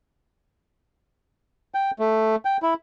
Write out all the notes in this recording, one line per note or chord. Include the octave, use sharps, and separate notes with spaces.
G5
A3
G5
E4